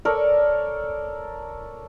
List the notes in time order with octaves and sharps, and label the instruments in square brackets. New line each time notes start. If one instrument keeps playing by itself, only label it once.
[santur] A4 A#4 C#5 D5